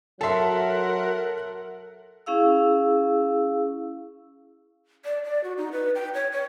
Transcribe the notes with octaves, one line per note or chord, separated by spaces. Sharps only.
F#3 A4 A#4 E5 F#5 A5 C6
C#4 E4 G#4 F5 E6
D5
D5
F#4
D#4
B4
G5
C#5
C#5